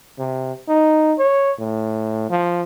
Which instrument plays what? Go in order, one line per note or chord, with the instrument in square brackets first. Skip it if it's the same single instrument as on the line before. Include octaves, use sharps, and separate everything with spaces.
[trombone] C3
D#4
C#5
A2
F3